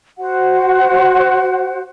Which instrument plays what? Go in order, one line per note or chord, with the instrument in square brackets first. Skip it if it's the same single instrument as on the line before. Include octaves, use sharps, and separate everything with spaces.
[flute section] F#4 C5 F#5